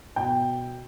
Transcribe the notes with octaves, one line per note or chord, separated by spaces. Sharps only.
B2 G5